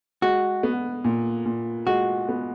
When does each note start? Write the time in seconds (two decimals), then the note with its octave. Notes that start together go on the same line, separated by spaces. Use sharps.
0.22 G#3 F#4
0.63 B3
1.04 A#2
1.45 A#2
1.87 G#3 F#4
2.29 B3